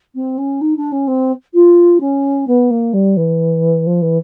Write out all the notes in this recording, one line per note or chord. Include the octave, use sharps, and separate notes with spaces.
C4
C#4
D#4
D4
C#4
C4
F4
C#4
B3
A#3
G3
E3
F3
E3